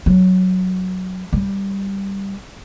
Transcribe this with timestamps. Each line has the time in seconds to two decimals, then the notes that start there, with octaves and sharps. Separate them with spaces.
0.06 F#3
1.33 G3